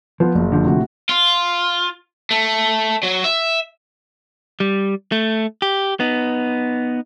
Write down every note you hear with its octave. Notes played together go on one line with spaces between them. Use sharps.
F3 B3 F4
F#1
D3 F3
A2 C3 F#4
F4
A3
F#3
E5
G3
A3
G4
B3 D#4